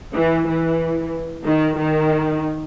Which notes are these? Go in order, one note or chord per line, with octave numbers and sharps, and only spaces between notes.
E3
E3
D#3
D#3